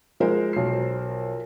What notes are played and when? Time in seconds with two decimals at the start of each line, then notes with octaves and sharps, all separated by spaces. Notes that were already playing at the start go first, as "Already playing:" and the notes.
0.20 F3 G#3 A#4 C5
0.53 B1 C7